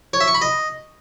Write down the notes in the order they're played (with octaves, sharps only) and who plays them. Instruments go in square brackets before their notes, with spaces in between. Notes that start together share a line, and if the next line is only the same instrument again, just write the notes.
[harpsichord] C#5
E5
C#6
B5
D#5